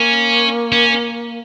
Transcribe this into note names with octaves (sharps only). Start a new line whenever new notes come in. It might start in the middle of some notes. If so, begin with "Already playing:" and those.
Already playing: A#3 C#4
C#4